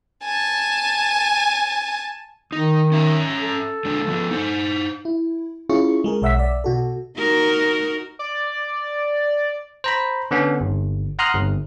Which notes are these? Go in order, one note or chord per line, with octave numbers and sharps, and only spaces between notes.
G#5 A5
D#3 D#4
C#4 E5 A#5
A4
D3 G#3 D4
F3 A#3 B3
D#4 C5
E4
C#4 E4 F4 G#4 C#6
G#3 G#4 A#4
B1 C#5 E5 F#5 E6 B6
D5
B2 F#4 A4
D#4 F#4 A#4
D5
C5 A#5 B5
D3 B3 C#4
G1
F#5 A#5 C6 D#6 F6 F#6
G1